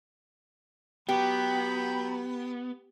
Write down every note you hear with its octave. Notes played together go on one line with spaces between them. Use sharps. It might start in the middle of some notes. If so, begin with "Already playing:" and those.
F#3 B3 G4 G5 B5